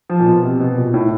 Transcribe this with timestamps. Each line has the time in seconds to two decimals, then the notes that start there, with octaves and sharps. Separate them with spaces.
0.10 F3
0.19 A#2
0.26 B2
0.43 C3
0.60 B2
0.76 A#2
0.94 A2